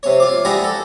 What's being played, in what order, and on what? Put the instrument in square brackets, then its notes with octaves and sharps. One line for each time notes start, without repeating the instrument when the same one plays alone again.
[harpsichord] C3 C#5
F4 D6
E4 G4 G#4 D5 F#5 A#5
A4